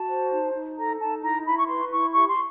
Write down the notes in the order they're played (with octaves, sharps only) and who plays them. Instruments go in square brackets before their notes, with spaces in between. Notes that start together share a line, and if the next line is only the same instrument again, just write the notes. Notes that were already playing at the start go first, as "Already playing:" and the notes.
Already playing: [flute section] F#4 A5
C5
D#4
D#4
A4 A#5
D#4 A5
E4 A#5
E4 B5
C#6
B4 C6
E4 C#6
G4 C#6
C6